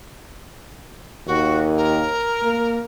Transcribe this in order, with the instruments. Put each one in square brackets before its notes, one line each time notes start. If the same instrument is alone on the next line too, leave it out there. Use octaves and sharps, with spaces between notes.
[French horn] D#2 [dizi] F#4
[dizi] A#4
[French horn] A#3